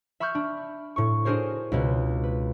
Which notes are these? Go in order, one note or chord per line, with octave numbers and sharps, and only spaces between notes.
E5 B5 C#6 F6 G6
D4
A2 C#6
D4 F#4 G#4 A#4 C5 C#5
C#2 B2 G#3 F#6
B4